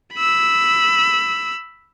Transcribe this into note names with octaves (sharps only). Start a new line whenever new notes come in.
B5 E6